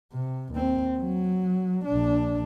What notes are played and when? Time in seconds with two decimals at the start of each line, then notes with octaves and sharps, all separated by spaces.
0.14 C3
0.53 D#2 C4
0.98 F#3
1.85 A#1 D4